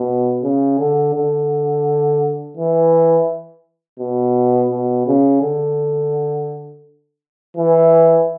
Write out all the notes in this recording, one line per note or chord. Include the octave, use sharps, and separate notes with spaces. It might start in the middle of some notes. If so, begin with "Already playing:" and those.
Already playing: B2
C#3
D3
D3
E3
B2
B2
C#3
D3
E3